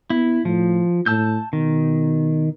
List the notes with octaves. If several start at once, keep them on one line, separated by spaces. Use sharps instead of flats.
B3 E4
A2 F3
A2 A5 E6 G6
B2 D#3